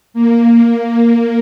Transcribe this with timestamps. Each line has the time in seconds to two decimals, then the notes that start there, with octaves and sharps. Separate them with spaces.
0.14 A#3